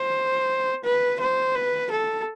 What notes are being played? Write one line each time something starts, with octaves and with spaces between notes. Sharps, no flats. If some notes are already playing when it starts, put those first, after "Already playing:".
Already playing: C5
B4
C5
B4
A4